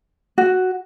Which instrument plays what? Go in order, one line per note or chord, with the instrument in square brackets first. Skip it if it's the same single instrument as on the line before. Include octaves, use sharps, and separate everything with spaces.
[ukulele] F#4